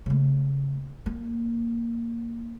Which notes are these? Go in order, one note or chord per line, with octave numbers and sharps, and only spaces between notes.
C#3 A3
A#3